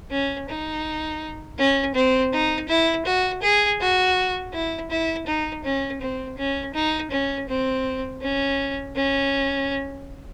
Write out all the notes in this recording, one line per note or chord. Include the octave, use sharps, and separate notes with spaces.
C#4
D#4
C#4
C4
D#4
E4
F#4
G#4
F#4
E4
E4
D#4
C#4
C4
C#4
D#4
C#4
C4
C#4
C#4